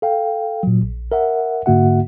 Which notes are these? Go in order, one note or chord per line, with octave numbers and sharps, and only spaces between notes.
A4 F5 G5
A#2 F#3
A#1
A#4 E5 F#5
G#2 D3 A#3 F#4 E5 F#5